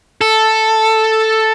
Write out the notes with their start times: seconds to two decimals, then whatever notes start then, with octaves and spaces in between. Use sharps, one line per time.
0.21 A4